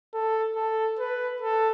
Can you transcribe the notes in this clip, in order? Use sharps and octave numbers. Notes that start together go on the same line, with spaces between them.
A4
A4
B4
A4